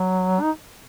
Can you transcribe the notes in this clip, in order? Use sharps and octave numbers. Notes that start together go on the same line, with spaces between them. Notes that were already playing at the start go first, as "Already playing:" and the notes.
Already playing: F#3
D#4